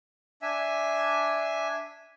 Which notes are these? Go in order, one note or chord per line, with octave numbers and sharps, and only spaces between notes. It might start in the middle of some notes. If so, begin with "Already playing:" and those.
D4 E5 G#5